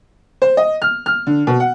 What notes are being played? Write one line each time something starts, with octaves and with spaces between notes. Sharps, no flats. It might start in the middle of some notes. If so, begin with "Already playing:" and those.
C5
D#5
F6
F6
D3
B2
F#5